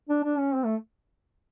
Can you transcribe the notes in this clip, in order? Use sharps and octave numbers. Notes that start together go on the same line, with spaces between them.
D4
D4
C#4
C4
A3